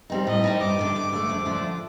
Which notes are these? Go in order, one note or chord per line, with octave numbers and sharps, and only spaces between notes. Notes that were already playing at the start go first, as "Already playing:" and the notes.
G3 C4 D#4
A2 D#5
G3 C4 D#4
G2 D6
D3 A3
G2
D3 A3
F2
D3 F3 A3 D4